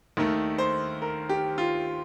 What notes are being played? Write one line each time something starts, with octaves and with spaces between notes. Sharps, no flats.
D#2 D#3 A3
C5
A#4
G4
F4